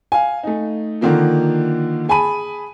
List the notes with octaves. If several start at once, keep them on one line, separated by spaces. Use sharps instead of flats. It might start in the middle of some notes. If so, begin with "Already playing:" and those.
F5 G#5
A3 D#4
D3 D#3 F3 A#3 F4
G#4 G#5 A5 B5 D#7